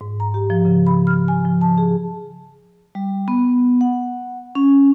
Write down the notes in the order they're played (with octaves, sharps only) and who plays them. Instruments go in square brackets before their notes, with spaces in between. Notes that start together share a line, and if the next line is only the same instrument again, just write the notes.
[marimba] G#2
A#5
G4
F3
C#3
B5
F6
G#5
F3
A5
G#4
[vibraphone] G3
B3
F#5
C#4